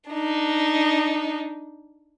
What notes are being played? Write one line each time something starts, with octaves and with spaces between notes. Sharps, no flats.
D4 D#4